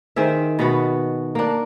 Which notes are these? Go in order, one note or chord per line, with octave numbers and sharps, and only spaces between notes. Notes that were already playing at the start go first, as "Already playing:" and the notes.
D#3 C4 G#4 E5
B2 B3 F#4
A#3 D4